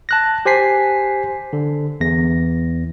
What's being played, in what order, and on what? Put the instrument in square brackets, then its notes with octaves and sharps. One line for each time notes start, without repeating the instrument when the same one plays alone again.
[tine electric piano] A5 F#6 A#6
G4 C5 G#5 B6 C7
D3
E2 A#6